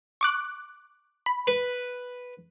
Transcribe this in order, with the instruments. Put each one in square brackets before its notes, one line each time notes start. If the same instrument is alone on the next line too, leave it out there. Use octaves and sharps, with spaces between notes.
[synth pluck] C#6 D6 F#6
B5
[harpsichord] B4